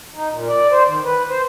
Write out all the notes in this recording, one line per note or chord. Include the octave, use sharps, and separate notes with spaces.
D#4
A#2
D5
C5
D#3
B4
C5